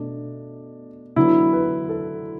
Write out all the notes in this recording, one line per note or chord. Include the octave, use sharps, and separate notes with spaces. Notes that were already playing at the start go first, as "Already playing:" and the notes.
Already playing: B2 A3 D4
D3 F#3 B3 E4
B4
A4